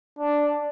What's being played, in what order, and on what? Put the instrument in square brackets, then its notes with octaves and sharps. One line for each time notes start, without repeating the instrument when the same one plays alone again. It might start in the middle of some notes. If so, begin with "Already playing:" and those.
[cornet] D4